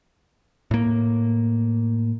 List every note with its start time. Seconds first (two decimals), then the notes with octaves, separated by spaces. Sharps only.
0.71 A2 A#3